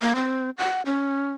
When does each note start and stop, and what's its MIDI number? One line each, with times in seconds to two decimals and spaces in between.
0.02 0.13 58
0.15 0.50 60
0.58 0.82 78
0.86 1.31 61